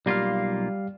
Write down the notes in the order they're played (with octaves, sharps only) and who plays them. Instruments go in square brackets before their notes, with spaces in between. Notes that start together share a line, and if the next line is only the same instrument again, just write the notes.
[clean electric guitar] B1 A#3 F4 [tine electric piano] G3 F5